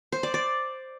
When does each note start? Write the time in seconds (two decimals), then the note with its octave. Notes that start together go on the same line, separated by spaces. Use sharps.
0.12 C5
0.23 D5
0.34 D5